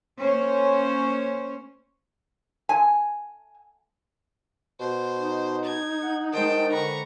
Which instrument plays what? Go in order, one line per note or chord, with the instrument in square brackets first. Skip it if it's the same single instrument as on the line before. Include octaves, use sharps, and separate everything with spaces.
[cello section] A#3 C#4 C5 C#5
[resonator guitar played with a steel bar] G#5
[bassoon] B2 [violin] C5
[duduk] D#4
[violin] G#6
[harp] F#5
[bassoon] D#3 [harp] G#3 C5 D#5 [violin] G5 A5
[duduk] D3 [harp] B4 B5 [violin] A#5 C#6